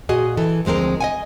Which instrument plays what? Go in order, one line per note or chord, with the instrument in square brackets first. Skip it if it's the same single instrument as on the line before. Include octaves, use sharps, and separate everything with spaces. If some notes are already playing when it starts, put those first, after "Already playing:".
[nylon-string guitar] A#2 F#4 G#4 D#5
E3 A4
D2 F3 G#3 C4 A#4
D#5 F#5 G#5